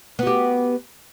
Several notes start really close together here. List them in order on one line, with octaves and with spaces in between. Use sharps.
B3 F#4 G4